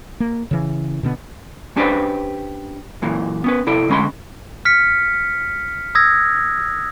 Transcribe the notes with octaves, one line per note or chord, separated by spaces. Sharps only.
A#3
C#3 E3
B2 D3 B3
C#4 D4 G4 B4 C5 D5
F#2 A#2 E3
B3 C#4 B4
C3 E4 A4 D5
D2 G#3 C#4 B5 C6
F6 B6 C#7
D#6 E6 G#6 A#6